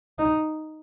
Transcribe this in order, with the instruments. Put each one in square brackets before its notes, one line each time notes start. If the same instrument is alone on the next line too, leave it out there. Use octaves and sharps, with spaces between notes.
[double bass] D#4